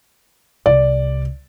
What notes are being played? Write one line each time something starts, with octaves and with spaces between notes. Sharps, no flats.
C2 D5